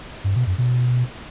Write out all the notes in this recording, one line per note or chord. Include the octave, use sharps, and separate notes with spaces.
G2
B2
F#2
B2